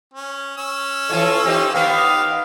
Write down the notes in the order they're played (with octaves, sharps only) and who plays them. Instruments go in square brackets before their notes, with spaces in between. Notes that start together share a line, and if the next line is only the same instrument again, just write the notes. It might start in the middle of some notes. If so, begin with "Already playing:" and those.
[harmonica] C#4
C#4 E6
[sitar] E3 F4 C#5 [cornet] A4
[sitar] C4 D#4 [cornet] G4
[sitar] D#3 B3 [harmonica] G4 [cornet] F5